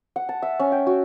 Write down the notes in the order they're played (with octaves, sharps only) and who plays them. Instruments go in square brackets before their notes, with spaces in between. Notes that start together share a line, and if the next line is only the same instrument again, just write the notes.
[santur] F#5
A5
E5
C#4
G5
F#4